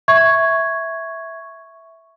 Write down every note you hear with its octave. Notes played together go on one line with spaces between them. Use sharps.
E5 C#6 G#6